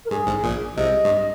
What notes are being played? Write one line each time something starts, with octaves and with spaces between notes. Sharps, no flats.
A#4
G2 G#4
G#1 G#2
A#1 A#2
C2 C3 D#5
G2